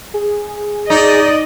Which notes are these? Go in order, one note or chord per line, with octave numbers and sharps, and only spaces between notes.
G#4
D#4 D5 D#5